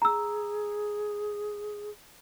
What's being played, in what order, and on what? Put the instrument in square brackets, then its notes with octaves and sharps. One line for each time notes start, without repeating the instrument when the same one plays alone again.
[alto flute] G#4 [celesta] A#5 E6